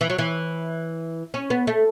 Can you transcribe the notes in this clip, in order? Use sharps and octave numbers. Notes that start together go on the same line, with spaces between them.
E3
F#3
E3
C#4
B3
A3